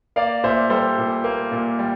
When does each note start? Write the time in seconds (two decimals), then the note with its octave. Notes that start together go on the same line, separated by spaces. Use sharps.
0.16 A#3 D5 F5
0.44 A#2 C5 E5
0.70 G3 A4 C5
0.98 A#2
1.24 A#3
1.52 A#2
1.79 G3